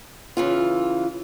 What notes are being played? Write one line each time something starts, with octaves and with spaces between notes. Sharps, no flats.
C#3 E3 F4